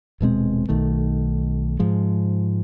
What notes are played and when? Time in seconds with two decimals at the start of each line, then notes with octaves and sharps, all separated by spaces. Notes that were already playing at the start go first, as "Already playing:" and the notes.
0.21 D#1 B2 G#3 C4
0.69 B1 D#3 A3
1.79 G#2 F3 G#3